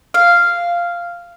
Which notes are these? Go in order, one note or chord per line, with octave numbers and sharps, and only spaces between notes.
F5